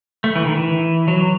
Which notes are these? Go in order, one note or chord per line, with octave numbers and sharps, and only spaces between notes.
A3
E3
D#3
E3
F#3